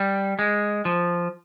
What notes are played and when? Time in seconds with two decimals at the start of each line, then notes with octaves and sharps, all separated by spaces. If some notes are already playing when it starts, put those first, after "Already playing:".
Already playing: G3
0.39 G#3
0.85 F3